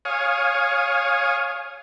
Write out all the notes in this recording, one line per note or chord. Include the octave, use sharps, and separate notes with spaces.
C#5 F5 G#5 D#6